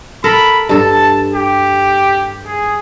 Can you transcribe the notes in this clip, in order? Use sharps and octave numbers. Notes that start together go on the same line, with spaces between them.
A4 A#4 B5
G2 A4 A5
G4
G#4